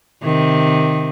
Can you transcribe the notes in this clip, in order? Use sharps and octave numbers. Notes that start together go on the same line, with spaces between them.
C3 D#3